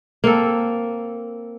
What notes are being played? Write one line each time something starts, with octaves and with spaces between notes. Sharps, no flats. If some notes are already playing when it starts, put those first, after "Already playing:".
A#3 C4 A4